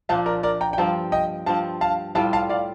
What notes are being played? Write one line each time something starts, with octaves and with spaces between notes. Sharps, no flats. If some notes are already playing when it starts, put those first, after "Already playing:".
A#2 F3 A#3 D4 F5 A5
A#4 D5
A#4 D5
G5 A#5
G5
G2 F3 C4 F5 A5
D#5 G5
G2 F3 C4 F5 A5
F5 A5
A2 G3 C4 F4 F5 A5
F5 A5
D5 F5